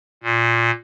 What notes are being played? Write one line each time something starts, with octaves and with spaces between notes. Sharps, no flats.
A#2